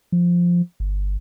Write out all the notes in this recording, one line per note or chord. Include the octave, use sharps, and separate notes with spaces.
F3
G1